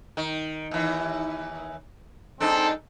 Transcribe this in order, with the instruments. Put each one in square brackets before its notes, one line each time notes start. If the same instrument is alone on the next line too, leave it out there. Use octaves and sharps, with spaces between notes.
[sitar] D#3
D#2 E3
[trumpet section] G#3 C4 A4 [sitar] D4 D#4